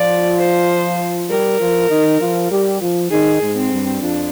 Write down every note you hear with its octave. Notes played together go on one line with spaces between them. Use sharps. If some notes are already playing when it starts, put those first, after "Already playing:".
Already playing: F3 F4 D5
C5
G3 G4 A#4
F3 F4
D#3 D#4
F3 F4
G3 G4
F3 F4
D#3 D#4 G#4
G#2 G#3
C4
G2 G3
F2 F3 D4